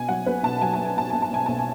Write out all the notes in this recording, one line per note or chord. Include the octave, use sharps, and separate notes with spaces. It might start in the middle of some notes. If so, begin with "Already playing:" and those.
Already playing: B2 G#5
F#3 F#5
B1 B4
B2 A5
F#3 G#5
B1 A5
G#5
B2 A5
B1 G#5
A5
B2 G#5
B1 A5
G#5